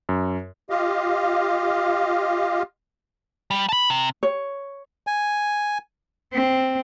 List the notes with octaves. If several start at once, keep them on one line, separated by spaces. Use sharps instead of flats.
F#2
F4 G4 D#5 F5
G3
A5 B5
C3
C#5
G#5
C4